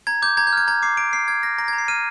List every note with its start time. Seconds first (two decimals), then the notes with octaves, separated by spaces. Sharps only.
0.07 A#5 G#6
0.22 D6 G6
0.37 A#5 G#6
0.47 G6
0.53 F6 G#6
0.67 A#5 G#6
0.82 D6 C7
0.97 A#5 D7
1.13 F6 C7
1.28 F6 G#6
1.43 F6 A#6
1.58 A#5 A#6
1.68 G#6
1.73 A#5
1.78 C7
1.88 F6 D#7